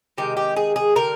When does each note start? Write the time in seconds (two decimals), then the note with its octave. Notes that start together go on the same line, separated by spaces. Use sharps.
0.18 C3 D#3 G#3 G4
0.37 G4
0.56 G#4
0.76 G#4
0.95 D3 G3 A#4